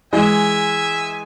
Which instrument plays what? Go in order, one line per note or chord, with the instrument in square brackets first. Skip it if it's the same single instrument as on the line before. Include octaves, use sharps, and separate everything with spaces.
[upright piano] E3 G#3 [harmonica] E5 G#5